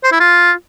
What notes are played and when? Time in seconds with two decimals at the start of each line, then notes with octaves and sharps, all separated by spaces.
0.04 C5
0.12 E4
0.20 F4